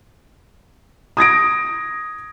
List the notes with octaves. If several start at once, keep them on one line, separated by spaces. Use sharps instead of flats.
D#6 G#6 A#6 D7